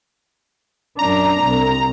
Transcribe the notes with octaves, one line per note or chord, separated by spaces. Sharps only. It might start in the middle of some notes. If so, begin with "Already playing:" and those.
F#2 D4 A#5
C2